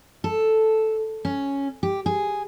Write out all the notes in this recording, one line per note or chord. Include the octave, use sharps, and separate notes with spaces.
A4
C#4
G4
G#4